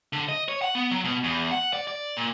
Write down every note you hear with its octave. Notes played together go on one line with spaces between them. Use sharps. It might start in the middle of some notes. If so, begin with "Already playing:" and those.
D3
D#5
C#5
F#5
B3
F#3
B2
E2
F#5
D5
D5
A#2